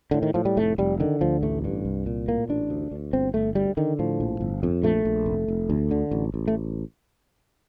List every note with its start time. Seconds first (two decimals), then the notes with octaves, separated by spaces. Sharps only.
0.11 A2 D3
0.22 D#3
0.34 A2 F3
0.45 G3
0.57 F1 A3
0.78 F1 G3
1.00 D3 D#3
1.21 D2 F3
1.43 A1 A3
1.64 G2
1.85 C2
2.06 A#2
2.28 A2 A#3
2.49 A1 D4
2.70 D2
2.91 D2
3.13 G1 C4
3.34 G1 A3
3.55 D2 G3
3.77 D3 D#3
3.99 A2 F3
4.20 A#1
4.41 G1
4.63 F2
4.83 A#1 A3
5.05 A#1
5.26 F1
5.48 F1
5.70 D2
5.91 D3
6.11 A1
6.34 A1
6.47 A3